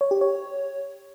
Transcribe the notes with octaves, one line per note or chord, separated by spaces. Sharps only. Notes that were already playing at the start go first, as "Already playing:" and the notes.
C#5
G4
C#5